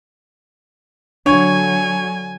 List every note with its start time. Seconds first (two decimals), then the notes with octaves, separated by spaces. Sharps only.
1.26 D3 F#3 D4 C#5 G#5